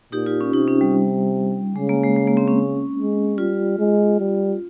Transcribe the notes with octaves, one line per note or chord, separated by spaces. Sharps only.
A#2 D#4 G4
F4
C#4
C3 D#4
C#4
G3
C#3 G#3
A#3
G#3
G#3
A#3
C4
C#4
G#3
G3 F4
G#3
G3